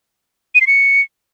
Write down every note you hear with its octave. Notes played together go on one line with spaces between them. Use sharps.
D#7
C7
C#7